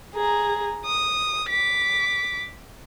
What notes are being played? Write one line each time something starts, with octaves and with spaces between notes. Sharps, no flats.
G#4 A#5
D#6
D6 B6